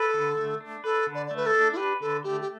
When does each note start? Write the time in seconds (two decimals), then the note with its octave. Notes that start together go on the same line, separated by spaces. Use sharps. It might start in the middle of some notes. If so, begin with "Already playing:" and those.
Already playing: A4 B4
0.14 D3
0.37 A3
0.61 D4
0.84 A4 B4
1.07 D3
1.15 D5
1.27 A3 D5
1.36 B4
1.46 A4
1.54 D4
1.73 E4
1.77 G4 B4
2.00 D3 A4
2.24 A3 G4
2.41 G4